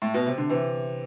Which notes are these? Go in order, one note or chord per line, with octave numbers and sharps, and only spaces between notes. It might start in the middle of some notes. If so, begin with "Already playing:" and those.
A2
B2
C3
D3
C3 E3